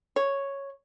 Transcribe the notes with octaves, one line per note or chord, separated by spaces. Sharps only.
C#5